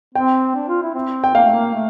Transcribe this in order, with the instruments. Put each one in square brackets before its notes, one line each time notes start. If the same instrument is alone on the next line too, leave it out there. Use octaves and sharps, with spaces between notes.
[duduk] C4 [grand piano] G5
[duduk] D4
F4
E4
C4
[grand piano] G5
[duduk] A#3 [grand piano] F5
[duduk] A3
A#3
A3